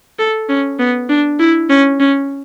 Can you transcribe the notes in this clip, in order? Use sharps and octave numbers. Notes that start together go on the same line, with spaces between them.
A4
C#4
B3
D4
E4
C#4
C#4